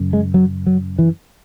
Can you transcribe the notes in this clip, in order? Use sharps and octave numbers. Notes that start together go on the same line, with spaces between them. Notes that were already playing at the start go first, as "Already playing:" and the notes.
Already playing: F#2 C#3
G#3
F#3
F#3
E3